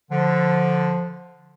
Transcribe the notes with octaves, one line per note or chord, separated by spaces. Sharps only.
D3 F3